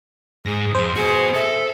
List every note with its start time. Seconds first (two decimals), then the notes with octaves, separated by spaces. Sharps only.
0.46 G#2 G#4 A#6
0.75 F2 C5
0.96 B3 F#4 G#4
1.34 A4 E5